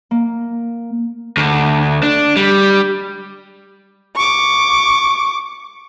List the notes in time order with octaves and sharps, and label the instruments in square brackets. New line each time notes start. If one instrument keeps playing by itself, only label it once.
[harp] A#3
[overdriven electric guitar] D2
D4
G3
[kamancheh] C#6 D6